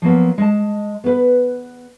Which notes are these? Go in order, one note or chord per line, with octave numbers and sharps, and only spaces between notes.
F3 F#3 A#3 B3
G#3 D#5 A5
B3 B4